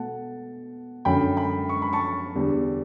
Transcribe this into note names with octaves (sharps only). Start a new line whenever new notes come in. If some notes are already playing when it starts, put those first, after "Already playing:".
Already playing: B2 A3 F#5 A5
F#2 D3 A3 G5 B5
G5 B5
C#6
B5
A5 C#6
E2 D3 G3